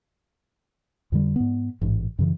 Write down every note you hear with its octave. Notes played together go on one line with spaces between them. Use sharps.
F2 D3 G3
G#2 B3
A1 G#2
F#2 C#3 E3